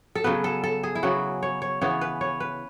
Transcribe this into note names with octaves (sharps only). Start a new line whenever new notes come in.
A4
C#3 F#3 B3 B4
A4
A4
G#4
E4
C#3 F#3 B3 F#4
C#5
C#5
C#3 E3 B3 C#5
B4
C#5
B4